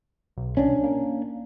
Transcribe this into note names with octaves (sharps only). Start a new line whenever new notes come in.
B1
C2 C#4 D4
A#3